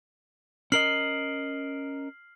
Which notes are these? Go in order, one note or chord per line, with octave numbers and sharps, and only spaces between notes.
C#4 A#4 D#5 F6 C7 F#7